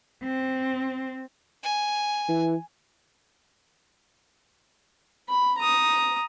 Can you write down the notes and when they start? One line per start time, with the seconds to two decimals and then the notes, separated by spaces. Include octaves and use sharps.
0.23 C4
1.63 G#5
2.29 E3
5.29 B5
5.58 A#5 D#6